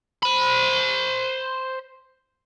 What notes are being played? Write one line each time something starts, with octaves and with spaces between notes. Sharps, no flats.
C5 B5